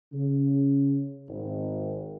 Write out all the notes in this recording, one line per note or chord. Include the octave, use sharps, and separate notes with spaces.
C#3
G#1